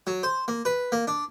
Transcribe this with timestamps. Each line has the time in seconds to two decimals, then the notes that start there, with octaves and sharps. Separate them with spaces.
0.07 F#3
0.23 C5
0.48 A#3
0.65 B4
0.92 A#3
1.08 D4